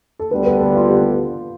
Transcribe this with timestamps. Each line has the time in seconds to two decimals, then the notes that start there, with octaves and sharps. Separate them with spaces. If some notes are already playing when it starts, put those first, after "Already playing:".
0.19 A4
0.31 D2 D3 G3 B3 B4
0.46 B4
0.60 A4
0.76 F4
0.90 G4